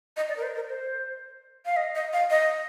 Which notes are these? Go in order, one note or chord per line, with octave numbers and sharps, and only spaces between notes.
D#5
D5
A#4
C5
A#4
C5
F5
D#5
D#5
F5
D#5